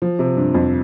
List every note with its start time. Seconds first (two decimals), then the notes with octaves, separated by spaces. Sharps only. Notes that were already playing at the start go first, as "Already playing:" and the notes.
0.02 F3
0.19 C3
0.37 G2
0.54 F2